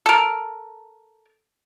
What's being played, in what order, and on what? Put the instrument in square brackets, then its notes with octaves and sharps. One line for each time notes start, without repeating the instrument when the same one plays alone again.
[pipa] A4 A#4